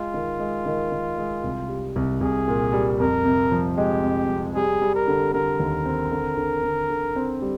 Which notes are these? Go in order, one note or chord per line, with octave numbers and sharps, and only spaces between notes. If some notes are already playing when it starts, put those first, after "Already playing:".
Already playing: G#3 F4
D#3
G#3
D#3
D#3
G#3
C2
G3
C2
C2 G#4
A#2
G3
F2 A#4
C3
F3
G#3 G4
F2
F2
G3 G#4
G3
A#4
D3
D3 A#4
D#2
C4
D3
D3
D3
D3
C4
G3